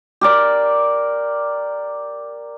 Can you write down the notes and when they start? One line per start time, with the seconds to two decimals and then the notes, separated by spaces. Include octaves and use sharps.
0.21 G4 A#4 D5